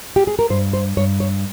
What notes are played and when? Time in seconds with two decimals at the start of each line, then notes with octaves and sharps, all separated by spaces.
0.16 G4
0.27 G#4
0.39 A#4
0.50 G2 C5
0.73 C5
0.97 G2 C#5
1.20 C#5